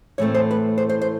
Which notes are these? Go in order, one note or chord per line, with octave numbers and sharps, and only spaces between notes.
A2 E3 A3 C4 C#5
C5
B4
C5
C5
C5